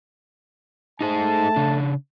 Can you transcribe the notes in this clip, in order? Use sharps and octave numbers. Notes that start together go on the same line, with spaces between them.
A3 D#4 G#4 C5 A5
C#3 D4